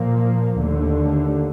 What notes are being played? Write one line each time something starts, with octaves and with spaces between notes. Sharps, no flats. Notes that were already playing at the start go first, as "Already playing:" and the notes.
Already playing: A#2 F3 A#3
D#2 D3 A3